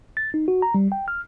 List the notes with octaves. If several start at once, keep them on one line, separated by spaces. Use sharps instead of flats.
A6
D#4
F#4
A#5
G3
G5
F6